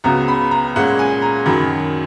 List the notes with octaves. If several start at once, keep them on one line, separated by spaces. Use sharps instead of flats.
C#2 C#3 F#3 B3 A#5
B5
A#5
A#2 G#3 C#4 F#5
G#5
A#5
F#2 D#3 F#3 B5